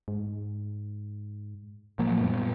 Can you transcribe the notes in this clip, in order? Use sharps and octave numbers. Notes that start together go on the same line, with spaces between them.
G#2
A#2 F3 F#3 A#3
F#2 G3 B3